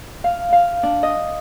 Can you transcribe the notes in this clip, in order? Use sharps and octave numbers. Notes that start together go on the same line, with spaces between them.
F5
F5
D4
D#5